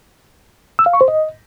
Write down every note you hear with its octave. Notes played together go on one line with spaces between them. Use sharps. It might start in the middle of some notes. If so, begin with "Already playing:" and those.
E6
F5
C#6
C5
D#5